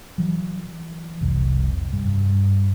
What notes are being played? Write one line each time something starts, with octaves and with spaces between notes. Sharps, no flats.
E3 F#3
F1 C2
G2